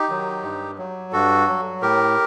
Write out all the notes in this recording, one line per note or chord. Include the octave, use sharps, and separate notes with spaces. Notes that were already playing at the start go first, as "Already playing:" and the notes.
Already playing: D#4 G4
D#3 F#3
G2
F#3
G2 F#4 A4
F#3
A2 G4 A#4